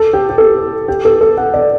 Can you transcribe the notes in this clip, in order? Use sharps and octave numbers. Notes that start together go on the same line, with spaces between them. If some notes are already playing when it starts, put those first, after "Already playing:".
Already playing: A4
G4
G4
A4
G4
A4
A4
F#5
D5